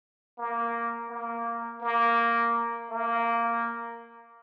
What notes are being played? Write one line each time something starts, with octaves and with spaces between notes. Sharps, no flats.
A#3
A#3
A#3
A#3